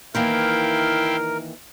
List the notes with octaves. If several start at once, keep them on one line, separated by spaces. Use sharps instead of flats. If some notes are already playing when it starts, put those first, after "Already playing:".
D#3 E3 A#3 E4 A#4 F5 G5